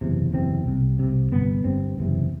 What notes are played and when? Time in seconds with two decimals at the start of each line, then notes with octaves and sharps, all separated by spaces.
0.01 F#1 E2 C3
0.33 F#1 E2 C3 C4
0.66 C2 C3
0.99 C2 C3
1.32 G1 G2 B3
1.64 G1 G2 C4
1.98 F#1 E2 C3